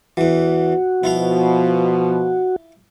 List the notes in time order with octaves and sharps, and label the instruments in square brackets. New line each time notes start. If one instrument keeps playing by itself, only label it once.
[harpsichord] E2 E3 [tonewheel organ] F#4
[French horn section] B2 F3 [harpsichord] E4 F4 F5